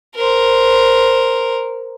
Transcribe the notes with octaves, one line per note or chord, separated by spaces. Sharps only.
A#4 C5